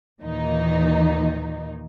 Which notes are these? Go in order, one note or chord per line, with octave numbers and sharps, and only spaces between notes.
D#2 A#2 D#3 E3 D#4